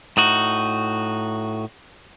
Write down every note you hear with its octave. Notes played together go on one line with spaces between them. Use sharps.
A2 D#4 F#4